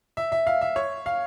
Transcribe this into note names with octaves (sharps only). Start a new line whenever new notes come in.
E5
E5
F5
E5
C#5
F5